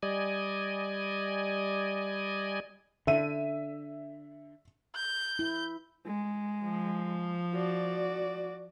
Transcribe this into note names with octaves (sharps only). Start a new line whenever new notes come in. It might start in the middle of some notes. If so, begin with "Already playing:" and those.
G3 D5 D#5 G#5
D3 E5 D#7
G6
E4
G#3
F3
F#4 D5